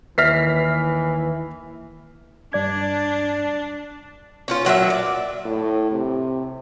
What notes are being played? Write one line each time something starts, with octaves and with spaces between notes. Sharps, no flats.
D#2 E3 B4 D5 E5 F6 B6 C7
G2 D4 D5 G#6
C#4 D4 F4
A#2 F#3 G#4 E5
D5
A2
C3